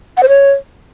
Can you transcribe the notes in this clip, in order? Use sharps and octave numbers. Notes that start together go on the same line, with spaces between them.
F#5
C5
C#5